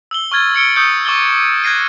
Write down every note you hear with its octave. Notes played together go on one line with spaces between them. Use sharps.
E6 F#7 G7
C#6 F6 G#6 A6
E6 C#7 D7 G7
C#6 D#6 E6 G6 C#7
C#6 D6 E6 A6 G7
F#6 G#6 A#6 C7 D#7